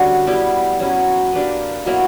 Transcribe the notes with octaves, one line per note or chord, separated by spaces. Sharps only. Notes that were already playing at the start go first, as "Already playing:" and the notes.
Already playing: D3 G3 C#4 F#4
G3 B3 E4 G4
F#3 C#4 E4
A#3 D4 G4 B4
B2 F#3 A#3 E4